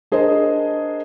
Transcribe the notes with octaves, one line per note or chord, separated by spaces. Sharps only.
D4 G#4 A#4 C5 D#5